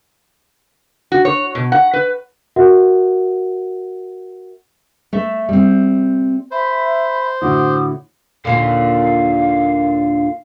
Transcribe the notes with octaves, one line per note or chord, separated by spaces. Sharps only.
F#4
C#5
B2
F#5
B4
F#4 A#4 E5 F#5
A3 E5
G3 C4
C5 E5 B5
A2 D3 F#4 D6 D#6
D#2 A#2 D3 F5